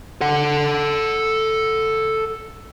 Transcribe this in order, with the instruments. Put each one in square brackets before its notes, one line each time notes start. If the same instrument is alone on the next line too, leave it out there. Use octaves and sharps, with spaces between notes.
[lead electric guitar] A4 F#5